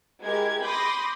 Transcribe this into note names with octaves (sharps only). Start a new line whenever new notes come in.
G#3 E4 G4 A#4 G#6
B5 C6 D6 D#6 G6 A#6